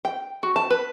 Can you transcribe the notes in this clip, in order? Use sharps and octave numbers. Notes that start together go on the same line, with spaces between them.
G5
F#4
A5
B4